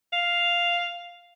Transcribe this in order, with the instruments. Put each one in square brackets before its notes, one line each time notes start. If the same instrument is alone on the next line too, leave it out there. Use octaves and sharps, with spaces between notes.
[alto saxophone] F5